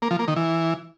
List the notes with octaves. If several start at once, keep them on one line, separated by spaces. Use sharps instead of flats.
A#3
F3
A#3
D#3
E3